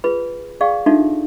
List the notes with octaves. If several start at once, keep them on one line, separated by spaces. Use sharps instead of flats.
F4 G#4 B4 B5
G#4 D5 F5 G5 C#6
D4 D#4 F4 F#4 A4 E5